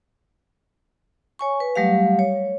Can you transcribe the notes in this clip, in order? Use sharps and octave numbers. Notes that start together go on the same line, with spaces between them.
C#5 G#5 C#6
B4
F#3 G3 A3 G4 F5
C#5